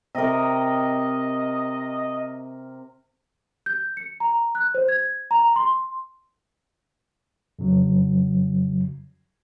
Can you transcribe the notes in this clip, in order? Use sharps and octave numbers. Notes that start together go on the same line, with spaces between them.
C3 A#4 D#5
G6
C#7
A#5
F#6
C5
G#6
A#5
C6
F2 C#3 F#3